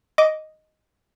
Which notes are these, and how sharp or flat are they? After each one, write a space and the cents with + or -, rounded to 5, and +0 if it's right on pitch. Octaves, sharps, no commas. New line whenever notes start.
D#5 +0 D6 -15